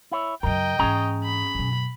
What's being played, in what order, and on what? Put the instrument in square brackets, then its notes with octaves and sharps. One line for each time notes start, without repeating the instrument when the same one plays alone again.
[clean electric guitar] E4 C#5
[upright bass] F#2 C#3 [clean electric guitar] A#4 [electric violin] D#5 G5
[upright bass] G#2 E3 [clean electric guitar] C#4 G#4 A#5
[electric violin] B5
[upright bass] F#2 B2